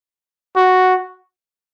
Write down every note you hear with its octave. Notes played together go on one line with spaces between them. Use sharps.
F#4